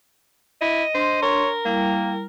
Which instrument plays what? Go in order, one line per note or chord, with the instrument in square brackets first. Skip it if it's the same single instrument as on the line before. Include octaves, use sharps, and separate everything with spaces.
[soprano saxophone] E4 [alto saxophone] D#5
[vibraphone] D4 C6 [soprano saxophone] C5
[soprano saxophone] A#4 [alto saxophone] C#5
[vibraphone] G3 E4 G5 [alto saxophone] A#3